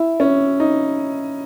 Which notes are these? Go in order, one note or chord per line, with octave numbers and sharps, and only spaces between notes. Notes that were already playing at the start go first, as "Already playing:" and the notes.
Already playing: E4
C#4
D#4